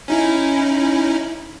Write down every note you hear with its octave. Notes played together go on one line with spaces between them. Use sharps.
C#4 D#4 E4